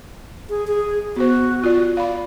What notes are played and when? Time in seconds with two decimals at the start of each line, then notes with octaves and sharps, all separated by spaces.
0.49 G#4
0.67 G#4
1.16 B3 F#4 C5
1.63 F4 D5
1.97 D5 F5 B5